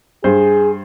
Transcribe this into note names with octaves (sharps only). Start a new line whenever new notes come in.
G2 G#4 C5